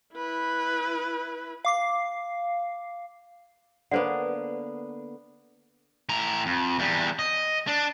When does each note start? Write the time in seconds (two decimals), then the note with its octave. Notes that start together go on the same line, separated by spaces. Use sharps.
0.16 E4 B4
1.65 F5 D6 C7
3.91 D3 A#3 B3 B4 C5 F#5
6.09 A2 A#5
6.46 F2
6.79 E2 G3
7.19 D#5
7.67 D4